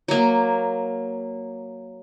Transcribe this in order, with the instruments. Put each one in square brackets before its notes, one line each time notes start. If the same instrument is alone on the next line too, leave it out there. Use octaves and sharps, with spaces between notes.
[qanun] F#3 A#3